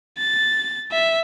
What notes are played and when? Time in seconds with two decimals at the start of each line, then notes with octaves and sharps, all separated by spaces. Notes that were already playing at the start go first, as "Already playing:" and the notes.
0.19 A6
0.92 E5